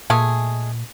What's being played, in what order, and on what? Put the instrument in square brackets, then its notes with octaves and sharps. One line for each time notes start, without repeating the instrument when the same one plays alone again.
[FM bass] A#2 [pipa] G#3 A3 G#4